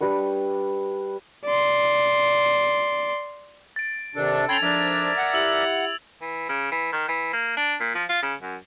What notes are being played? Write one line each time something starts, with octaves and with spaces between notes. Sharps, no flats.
G3 D4 B4 C#6
D5 C6
A6 D7
C3 D#3 D4 A4
C#4 G5 B5 C6 G#6 A6 F7
F2 G#2 F3 D4 A#4 D5 E5
F#5
E4 G4 E6 F#7
E3
C#3
E3
D#3
E3
A#3
D4
A#2
F3
F4
C#3
F#2